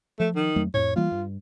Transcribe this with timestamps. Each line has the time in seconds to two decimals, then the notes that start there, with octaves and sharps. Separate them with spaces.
0.20 F3 A3
0.35 D#3
0.56 F2 F#3 A3
0.74 F2 A2 C#5
0.96 E3 G3 A#3 F4
1.12 G2